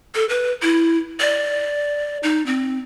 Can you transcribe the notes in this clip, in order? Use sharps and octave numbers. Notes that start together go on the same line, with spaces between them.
A4
B4
E4
D5
D#4
C4